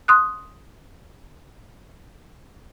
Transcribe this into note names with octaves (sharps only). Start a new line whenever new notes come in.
C6 D#6 F#6